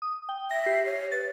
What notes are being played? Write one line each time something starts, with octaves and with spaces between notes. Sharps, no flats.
D#6
G5
E5 A#6
G4 C7
C#5
B4 A6